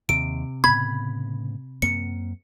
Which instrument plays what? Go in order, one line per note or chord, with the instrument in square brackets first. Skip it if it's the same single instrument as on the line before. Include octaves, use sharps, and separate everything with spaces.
[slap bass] D#2 [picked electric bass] C3 [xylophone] D7
[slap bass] A2 C#3 B3 [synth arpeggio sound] B5 [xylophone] G#6
[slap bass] F#2 A#3 C4 [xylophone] C#7